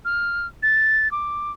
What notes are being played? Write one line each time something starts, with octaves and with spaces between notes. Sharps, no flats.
F6
A6
D6